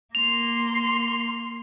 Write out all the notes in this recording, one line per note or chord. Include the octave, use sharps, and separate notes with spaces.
A#3 C6 F7